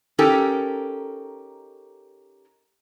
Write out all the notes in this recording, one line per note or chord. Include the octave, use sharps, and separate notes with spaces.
C#4 D#4 G4 A4 A#4